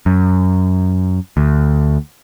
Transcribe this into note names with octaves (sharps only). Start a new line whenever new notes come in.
F#2
D2